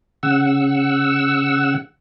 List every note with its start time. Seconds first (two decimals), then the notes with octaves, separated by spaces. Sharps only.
0.23 C#3 F#5 E6